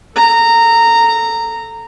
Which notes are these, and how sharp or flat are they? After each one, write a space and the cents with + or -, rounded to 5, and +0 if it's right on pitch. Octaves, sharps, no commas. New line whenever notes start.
A4 +0 A#5 -15